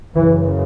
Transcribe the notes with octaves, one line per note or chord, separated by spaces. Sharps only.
F#2 C#3 E3